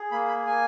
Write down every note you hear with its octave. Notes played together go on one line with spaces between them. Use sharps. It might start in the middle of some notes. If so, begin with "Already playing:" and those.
Already playing: G#4
A#3 B5
B5
A#3 G#5